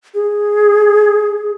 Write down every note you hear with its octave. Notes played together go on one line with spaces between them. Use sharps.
G#4